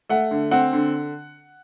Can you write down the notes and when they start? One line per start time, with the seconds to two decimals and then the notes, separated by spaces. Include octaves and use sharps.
0.09 A3 F#5
0.31 D3
0.51 C4 F#5
0.73 D3